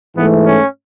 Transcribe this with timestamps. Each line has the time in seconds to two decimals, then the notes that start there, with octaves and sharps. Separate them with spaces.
0.15 G#2 E3 A3 B3
0.46 C#4